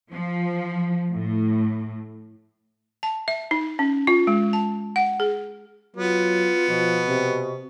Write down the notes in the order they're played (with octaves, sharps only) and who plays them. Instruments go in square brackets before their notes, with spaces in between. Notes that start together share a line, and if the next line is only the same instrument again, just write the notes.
[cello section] F3
A2
[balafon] A5
E5
D#4
C#4
F4
G#3
A5
F#5
G#4
[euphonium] F#3 [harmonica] B3 [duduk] F4
[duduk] B2 [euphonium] F3
[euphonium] C3